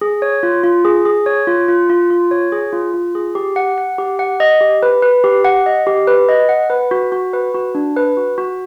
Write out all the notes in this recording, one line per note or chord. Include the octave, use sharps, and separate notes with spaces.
G#4
C#5
F4
F4
G#4
G#4
C#5
F4
F4
F4
F4
C#5
G#4
F4
F4
G#4
G4
F#5
F#5
G4
F#5
D#5
G4
B4
B4
G4
F#5
D#5
G4
B4
D#5
F#5
B4
F#4
F#4
B4
F#4
D4
B4
F#4
F#4